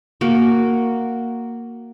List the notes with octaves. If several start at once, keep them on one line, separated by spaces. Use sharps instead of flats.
A#3 F#4